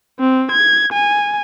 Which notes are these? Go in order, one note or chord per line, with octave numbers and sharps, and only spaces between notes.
C4
G#6
G#5